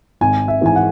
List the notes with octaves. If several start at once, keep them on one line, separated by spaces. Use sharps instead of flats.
G#1 G#5
E5
G#2 E3 G#5
F#5